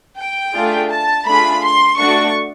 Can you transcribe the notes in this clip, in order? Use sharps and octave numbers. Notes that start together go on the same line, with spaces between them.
G5
A3 D4 F4 G#4
A5
A3 D4 F4 G#4 B5
C6
A3 D4 F#4 A4 C#6